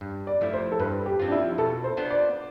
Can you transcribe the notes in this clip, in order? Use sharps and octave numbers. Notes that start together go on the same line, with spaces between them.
G2
D5
F3 A3 E4
C5
A4
G2 B4
G4
F3 C4 F4
D4
E4
B2 A4
C5
B3 D4 F4 C5
D5